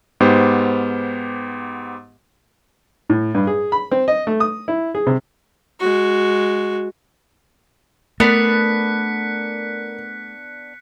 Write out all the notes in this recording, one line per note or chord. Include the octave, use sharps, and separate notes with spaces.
G#2 B3 G4 C5
A2
G2
G#4
B5
C4
D#5
A3
D#6
E4
G#4
C3
G#3 F#4
A3 B3 D4 A#4 B4 F#6 B6 C#7